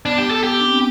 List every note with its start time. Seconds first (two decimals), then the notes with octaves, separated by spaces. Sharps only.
0.05 B3 D4
0.18 G4
0.31 A4
0.44 G4
0.60 D4
0.68 C4
0.76 B3